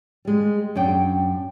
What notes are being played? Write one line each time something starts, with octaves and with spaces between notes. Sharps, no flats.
G3 G#3
F#2 D4 G5